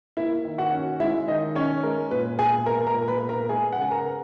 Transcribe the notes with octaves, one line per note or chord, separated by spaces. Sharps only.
A#3 E4 E5
D#3
F#4 F#5
C#4
G#3 E4 E5
D#3 D#4 D#5
C#4 C#5
G#3 A#4
A#2 B4
B3 G#4 G#5
G#3 A#4 A#5
A#4 A#5
A#2
B4 B5
B3
A#4 A#5
G#3 G#4 G#5
F#5
C#3 G#5
A#4 A#5
B3